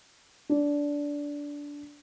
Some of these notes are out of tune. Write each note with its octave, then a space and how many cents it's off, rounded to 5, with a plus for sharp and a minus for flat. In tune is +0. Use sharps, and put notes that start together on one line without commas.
D4 -15